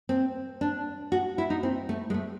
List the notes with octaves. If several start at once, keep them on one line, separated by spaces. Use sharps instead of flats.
C4
D4
F#4
E4
D#4
C4
A3
G#3
A3